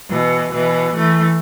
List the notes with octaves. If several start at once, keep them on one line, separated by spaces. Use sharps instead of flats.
B2 E3
B2 E3
E3 A3